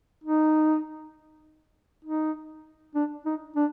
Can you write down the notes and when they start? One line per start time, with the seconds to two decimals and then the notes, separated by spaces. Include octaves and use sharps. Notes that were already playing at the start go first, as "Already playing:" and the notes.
0.24 D#4
2.05 D#4
2.95 D4
3.25 D#4
3.56 D4